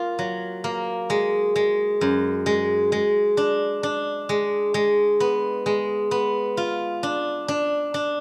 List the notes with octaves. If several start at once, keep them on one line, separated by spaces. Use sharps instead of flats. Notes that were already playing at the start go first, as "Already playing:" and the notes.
Already playing: A#3 F4
F#3
A#3
G#3
G#3
F#2
G#3
G#3
D4
D4
G#3
G#3
B3
G#3
B3
F4
D4
D4
D4